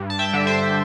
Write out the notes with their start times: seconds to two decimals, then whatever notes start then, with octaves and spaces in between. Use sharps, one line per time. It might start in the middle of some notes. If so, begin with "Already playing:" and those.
Already playing: G2
0.10 A5
0.19 E5 G5
0.33 D3
0.47 C5 E5